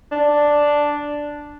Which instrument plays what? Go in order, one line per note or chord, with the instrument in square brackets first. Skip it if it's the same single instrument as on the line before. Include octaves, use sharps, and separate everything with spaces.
[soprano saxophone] D4